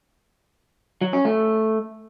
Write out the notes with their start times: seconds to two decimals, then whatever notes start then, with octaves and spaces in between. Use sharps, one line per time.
1.01 F#3
1.13 C#4
1.25 A3